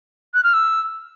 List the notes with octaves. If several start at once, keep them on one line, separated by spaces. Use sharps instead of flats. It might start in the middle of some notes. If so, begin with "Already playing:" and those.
F#6
F6
E6